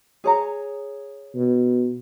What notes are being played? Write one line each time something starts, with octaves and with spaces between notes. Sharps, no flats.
G#4 C#5 A#5
B2